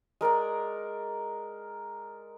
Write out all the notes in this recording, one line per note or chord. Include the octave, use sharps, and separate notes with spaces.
G#3 A#4 D5 A#5